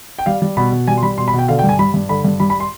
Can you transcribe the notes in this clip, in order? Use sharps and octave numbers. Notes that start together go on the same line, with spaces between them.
G5
G3 F5
G3
B2 B5
B2
G3 G#5
C6
G3 B5
B2 C6
B5
B2
G5
D3 F5
G5
G2
G#5
G3 B5
G2
D3 B5
G2
G3 B5
B5
C6